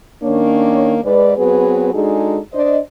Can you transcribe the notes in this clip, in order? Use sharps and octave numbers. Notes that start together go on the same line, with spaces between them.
D#3 A#3 C#4 D4 C#5
G#2 B4 D5
F#3 B3 C4 G#4 B4
G#3 D4 D#4 F#4 G#4 A4
D4 C5 D5 D#5